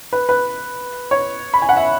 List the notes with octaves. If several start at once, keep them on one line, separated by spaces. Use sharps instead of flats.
B4
B4
C#5
B5
G#5
F#5
E5